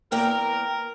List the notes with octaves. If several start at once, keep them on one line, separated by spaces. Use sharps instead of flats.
E2 A#3 A#4 G5